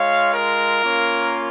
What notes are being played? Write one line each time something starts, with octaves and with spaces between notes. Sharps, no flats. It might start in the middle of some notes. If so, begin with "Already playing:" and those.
Already playing: G#3 F4 C#5 F5
A#4
A#3 C#4 F4